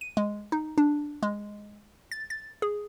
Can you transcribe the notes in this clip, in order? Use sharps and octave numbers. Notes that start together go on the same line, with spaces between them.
D#7
G#3
D#4
D4
G#3
A6
A6
G#4